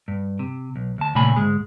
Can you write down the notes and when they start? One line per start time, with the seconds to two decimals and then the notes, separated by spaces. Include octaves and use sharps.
0.08 G2
0.39 C3
0.76 B1
0.98 D2 A5
1.15 A#2 C#3 A3 G#5 B5
1.36 D2 G#2 G#3